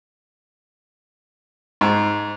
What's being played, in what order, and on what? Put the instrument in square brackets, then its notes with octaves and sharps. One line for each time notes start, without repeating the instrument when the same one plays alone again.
[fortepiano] G#2